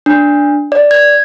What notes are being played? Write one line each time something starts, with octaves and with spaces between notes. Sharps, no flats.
D4
D5
G#6